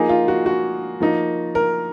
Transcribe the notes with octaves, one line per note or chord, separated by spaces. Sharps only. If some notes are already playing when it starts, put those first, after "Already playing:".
Already playing: F3 A#3 D#4 G#4
F4
F#4
F#4
F3 A#3 D#4
A#4